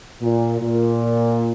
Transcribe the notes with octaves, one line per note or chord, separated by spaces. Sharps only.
A#2
A#2